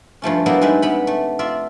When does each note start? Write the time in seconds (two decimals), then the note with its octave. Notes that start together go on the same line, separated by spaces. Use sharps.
0.22 G2 F3 A3 C#4
0.46 F#3 G3 A#3 B3 E4 F4
0.61 G3 G#3 D#4 B4 E5
0.82 C3 B3 B5
1.07 A3
1.39 F4 D5 E5